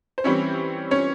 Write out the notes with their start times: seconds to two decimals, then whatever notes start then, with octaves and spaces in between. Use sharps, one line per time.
0.18 C5
0.24 E3 G3 C4 C#4 E4 C#5
0.91 C#4 C#5